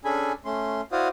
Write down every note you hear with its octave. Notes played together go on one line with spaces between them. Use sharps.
C#4 D4 G#4 A4 G#5 B5
A3 C#4 C6
E4 F#4 C5 D5 F5 D#6